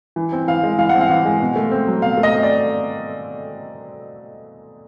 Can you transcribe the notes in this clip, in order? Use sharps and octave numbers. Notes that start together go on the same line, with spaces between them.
E3
C4
E3 F5
G#3
E3 F5
F#5
C4
F5
E3
G#3
B2
A3
C4
F#3
B2 F5
A3
D#5
C4
D5